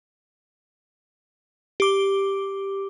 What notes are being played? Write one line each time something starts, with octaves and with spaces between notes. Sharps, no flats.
G4 D6